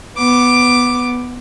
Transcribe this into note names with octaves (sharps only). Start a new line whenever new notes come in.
B3 D6